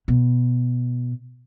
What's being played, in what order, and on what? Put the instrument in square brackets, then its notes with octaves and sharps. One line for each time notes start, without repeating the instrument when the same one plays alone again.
[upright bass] B2